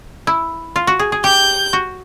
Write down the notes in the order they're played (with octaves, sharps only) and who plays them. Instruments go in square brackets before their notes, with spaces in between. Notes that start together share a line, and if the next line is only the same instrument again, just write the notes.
[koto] E4
F4
F#4
G#4
G#4
[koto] G4 [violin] G6
[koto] F#4